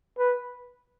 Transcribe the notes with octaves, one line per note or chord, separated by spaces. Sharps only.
B4